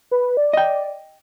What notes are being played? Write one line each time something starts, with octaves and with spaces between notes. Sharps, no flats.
B4
D5
D#5 G5